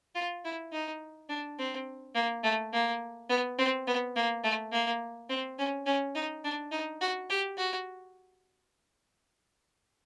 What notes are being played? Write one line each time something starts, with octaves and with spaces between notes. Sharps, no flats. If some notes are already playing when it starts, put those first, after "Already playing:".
F4
E4
D#4
D4
C4
A#3
A3
A#3
B3
C4
B3
A#3
A3
A#3
C4
C#4
C#4
D#4
D4
D#4
F#4
G4
F#4